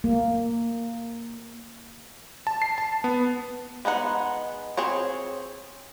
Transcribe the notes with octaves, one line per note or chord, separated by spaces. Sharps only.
A#3
A5
C7
A5
B3
G#3 B3 D#4 F#5
C4 G#4 C#5